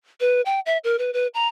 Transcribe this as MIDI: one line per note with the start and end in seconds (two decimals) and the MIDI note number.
0.21 0.41 71
0.46 0.60 79
0.66 0.78 76
0.84 0.99 70
0.99 1.13 71
1.13 1.27 71
1.34 1.47 82